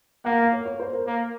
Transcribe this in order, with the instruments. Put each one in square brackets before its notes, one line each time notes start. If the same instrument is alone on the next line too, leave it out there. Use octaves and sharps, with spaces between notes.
[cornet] A#3 [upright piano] F#5
[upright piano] F5
C#5
C#5
C5
A#4
[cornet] A#3